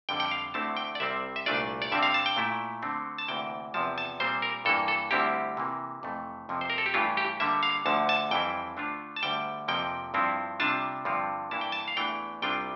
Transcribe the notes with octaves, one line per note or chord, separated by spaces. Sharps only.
F2 D3 G3 G5
G5
F5
D2 D3 A3 C4 E4 A5
G5
D5
C2 C3 G3 C4 E5
E5
C2 A#2 A3 D4 F4 D5
D5
G2 D3 G3 C4 E5
F5
A5
G5
A#2 A3 E4
D3 A3 C4
A5
D2 C3 E3 A#3 G5
E2 C3 F3 A5
A5
A#2 G3 C4 C5
A#4
G2 E3 A#3 A4
A4
D2 D3 G3 C4 E4 G4
C3 E3 A#3
F2 C3 E3 A3
F2 C3 F3 A#3
C5
A#4
A4
G4
G2 E3 A3 E4 F4
G4
D3 G3 A#3 E5
F5
D2 D3 F3 A5
A5
F2 E3 G3 C4 E4 G5
D3 A3 D4 F4
A5
D2 D3 G3 G5
F2 C3 F3 A#3 G5
G2 F3 C4 E4
C3 G3 D4 F4 A5
G2 D3 F3 C4 F4
G2 E3 A#3 E4 A5
G5
A5
F5
E2 E3 A3 D4 G5
C2 C3 G3 D4 F4 G5